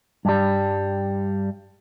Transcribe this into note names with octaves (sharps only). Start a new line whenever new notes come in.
G2 G3